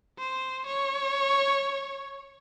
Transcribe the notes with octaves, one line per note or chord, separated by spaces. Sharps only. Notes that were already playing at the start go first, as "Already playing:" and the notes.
C5
C#5